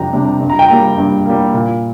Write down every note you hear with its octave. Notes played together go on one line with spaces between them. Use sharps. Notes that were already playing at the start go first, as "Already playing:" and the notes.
Already playing: F2 C3 G3 D4 G5 A#5
C3 G3 D4
G2
A#5
G5
G3 A#3 A#5
G2
G3 A#3
A#2